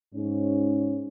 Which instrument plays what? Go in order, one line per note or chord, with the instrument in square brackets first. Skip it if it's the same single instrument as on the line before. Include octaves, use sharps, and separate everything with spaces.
[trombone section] G#2 C#4